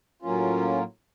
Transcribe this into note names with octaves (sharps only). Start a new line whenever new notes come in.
A2 F#3 A#3 C#4 F4